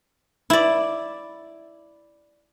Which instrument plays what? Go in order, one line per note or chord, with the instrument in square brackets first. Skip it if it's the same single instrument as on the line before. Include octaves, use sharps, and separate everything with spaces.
[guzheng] E4 D5